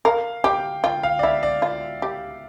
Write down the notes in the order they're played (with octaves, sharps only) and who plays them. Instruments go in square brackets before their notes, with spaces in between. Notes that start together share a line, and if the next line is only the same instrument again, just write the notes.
[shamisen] A#4 [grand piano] F5
[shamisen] G4 [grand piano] G5
[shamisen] F4 [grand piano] G5
[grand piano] F5
D5
[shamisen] E4 [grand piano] E5
[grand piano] D5
[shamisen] F4
G4